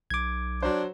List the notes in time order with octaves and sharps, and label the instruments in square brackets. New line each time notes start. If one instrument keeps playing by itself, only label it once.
[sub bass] B1 [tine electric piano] D6 G#6
[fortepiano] F#3 C5 [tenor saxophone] D4